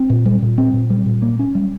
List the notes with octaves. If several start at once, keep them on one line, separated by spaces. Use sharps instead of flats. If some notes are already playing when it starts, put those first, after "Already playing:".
Already playing: C4
A#2
G3
A#2
C4
A#2
G3
A#2
A#3
C#4
G3